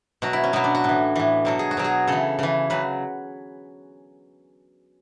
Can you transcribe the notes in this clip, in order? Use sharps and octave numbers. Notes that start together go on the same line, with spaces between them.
B2 F#3 F#4
E4
C#4
B2 F#3 B3
D4
F#4
A2 E3
A2 E3
B2 F#3 A4
G#4
F#4
B2 F#3
G#4
C#3 E3 A4
C#3 E3
C#3 F#3 B4